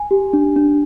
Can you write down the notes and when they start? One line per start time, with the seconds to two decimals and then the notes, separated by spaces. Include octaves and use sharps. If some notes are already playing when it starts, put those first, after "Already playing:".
Already playing: G#5
0.11 G4
0.33 D4
0.56 D4